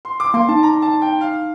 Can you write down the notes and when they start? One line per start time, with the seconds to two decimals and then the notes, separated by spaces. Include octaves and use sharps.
0.05 C6
0.20 D6
0.34 A#3 C6
0.49 D#4 A5
0.63 A#5
0.82 A5
1.02 G5
1.21 F5